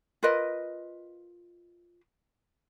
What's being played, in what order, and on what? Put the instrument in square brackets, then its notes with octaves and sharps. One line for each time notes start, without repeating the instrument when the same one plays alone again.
[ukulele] F4 A#4 B4 D#5